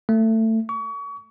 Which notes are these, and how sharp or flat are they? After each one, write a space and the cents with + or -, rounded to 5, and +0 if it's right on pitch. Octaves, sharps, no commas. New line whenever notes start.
A3 +20
C#6 +35